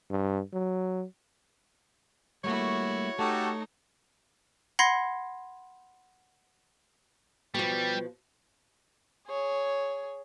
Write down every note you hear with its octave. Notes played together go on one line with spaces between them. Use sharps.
G2
F#3
G3 A3 A#3 E4 F#4 C#5
A3 D#4 F#4 G4 A4 A5
F#5 B5 C6 G#6 A#6 C7
B2 F3 G3
G#4 C#5